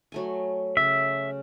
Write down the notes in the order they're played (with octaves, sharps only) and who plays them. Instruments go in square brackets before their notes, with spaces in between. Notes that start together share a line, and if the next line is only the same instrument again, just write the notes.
[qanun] F#3 A3 G#5
[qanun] C#3 [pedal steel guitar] E5